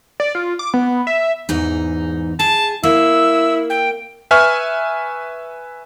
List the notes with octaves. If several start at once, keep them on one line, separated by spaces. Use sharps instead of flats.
D5
F4
D6
B3
E5
E2 G#2 D#4
G#4 A5
A#3 E4 E6
G5
B4 E5 G#5 C#6 F6